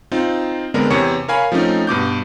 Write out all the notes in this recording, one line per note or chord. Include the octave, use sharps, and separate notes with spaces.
C4 D#4 F4
D3 G#3 B3 C4 D4 A#4
E2 C3 C#5 C#6 C#7
A#4 C#5 F5 G#5 B5
F3 A3 C4 C#4 D#4
G2 B2 D6 G6